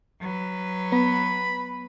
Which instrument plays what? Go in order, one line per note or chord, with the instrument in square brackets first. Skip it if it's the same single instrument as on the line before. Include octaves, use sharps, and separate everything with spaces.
[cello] F#3 B4
[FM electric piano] B3 [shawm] B5